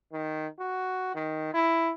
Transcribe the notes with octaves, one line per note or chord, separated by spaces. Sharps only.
D#3
F#4
D#3
E4